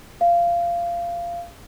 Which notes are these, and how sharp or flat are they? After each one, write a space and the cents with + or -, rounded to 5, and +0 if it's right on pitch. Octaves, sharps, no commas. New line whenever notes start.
F5 -20